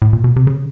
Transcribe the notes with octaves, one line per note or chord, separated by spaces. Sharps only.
A2
A#2
B2
C3
C#3